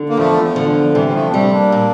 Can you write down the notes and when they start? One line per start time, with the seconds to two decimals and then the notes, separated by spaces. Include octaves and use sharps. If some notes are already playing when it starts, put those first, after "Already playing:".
Already playing: D3
0.09 A#3
0.17 E2 F3 A3
0.43 F3
0.56 D3
0.69 F3
0.95 C3 E3 G3
1.09 G3
1.14 F3 A3
1.29 D4
1.33 G3 A3 C4
1.52 A#3 D4
1.72 A#2